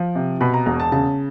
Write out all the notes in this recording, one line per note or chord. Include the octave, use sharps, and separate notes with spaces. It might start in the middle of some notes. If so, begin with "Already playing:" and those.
Already playing: F3
C3
B2 B5
A#5
E1 A#5
A5
C#3 A5